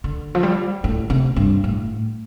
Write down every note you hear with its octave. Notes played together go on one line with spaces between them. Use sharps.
D3
F3
G3
A2
C3
G2
A2